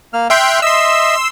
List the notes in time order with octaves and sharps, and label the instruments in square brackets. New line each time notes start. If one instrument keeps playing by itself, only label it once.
[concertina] A#3 F6
[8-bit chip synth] E5 G5 C6 [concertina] F6 F#6
[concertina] D#5 E5 [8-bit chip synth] C6 E6